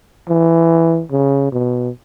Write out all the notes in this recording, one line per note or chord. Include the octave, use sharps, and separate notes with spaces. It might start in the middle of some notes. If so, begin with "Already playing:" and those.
E3
C#3
B2